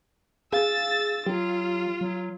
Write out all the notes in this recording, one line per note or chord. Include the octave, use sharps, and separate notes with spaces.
G#4 F5 E6 A6
F#3 F4 G4
F#3